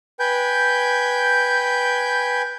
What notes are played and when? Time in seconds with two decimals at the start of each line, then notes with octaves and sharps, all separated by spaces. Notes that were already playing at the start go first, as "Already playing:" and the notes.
0.20 B4 G5 G#5 G6